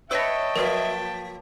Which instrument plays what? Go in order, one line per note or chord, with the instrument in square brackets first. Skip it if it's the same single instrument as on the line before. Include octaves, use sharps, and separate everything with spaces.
[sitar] B4 C#5 [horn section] D#5 E5 [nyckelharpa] G5 A5 [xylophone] E6 A#6
[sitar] F3 A#3 [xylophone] A#4 B4